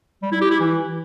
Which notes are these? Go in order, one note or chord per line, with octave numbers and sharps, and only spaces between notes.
G3
E4
G4
E4
E3